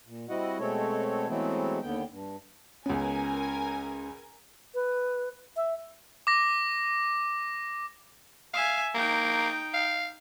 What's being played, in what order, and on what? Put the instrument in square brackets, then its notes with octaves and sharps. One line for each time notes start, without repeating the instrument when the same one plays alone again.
[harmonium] A#2
G3 C4 E4 F#4 D#5 F#5
B2 G#3 A3 C4 A4 C#5
E3 F#3 G#3 A3 B3 C4
D#2 D3 B3 G5
G2
[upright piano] C#2 B3 [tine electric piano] C#4 [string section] A#4 G#5
[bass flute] B4
E5
[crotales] D6 A#6
[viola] E5 G#5 [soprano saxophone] F5
[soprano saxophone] A#3 [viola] D#4 G5
[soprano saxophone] F5